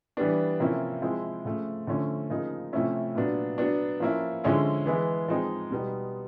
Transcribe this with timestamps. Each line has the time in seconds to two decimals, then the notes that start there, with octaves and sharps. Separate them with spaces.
0.17 E3 G3 B3 D4
0.60 C3 F3 A#3 C#4 E4
1.02 F3 G#3 C4 E4
1.45 C#3 F3 A3
1.87 D3 F3 A3 C#4
2.30 C#3 F3 A#3 D#4
2.73 C3 F3 A3 C#4 E4
3.15 A#2 F#3 B3 D4
3.58 F#3 B3 D4
4.00 F3 A#3 C#4 E4
4.44 D3 F3 G#3 C#4 E4
4.86 E3 G#3 B3 E4
5.28 F3 G#3 C4 D#4
5.71 B2 G3 B3 D#4